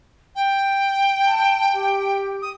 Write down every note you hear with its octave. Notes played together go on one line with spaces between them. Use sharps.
G5
A5
G4
D#6